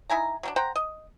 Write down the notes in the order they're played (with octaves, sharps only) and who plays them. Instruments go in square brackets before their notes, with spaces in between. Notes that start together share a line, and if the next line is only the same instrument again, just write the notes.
[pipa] D#4 E4 G#5 A#5
F#3 G3 D4
C5 F#5 G5 A#5
D#5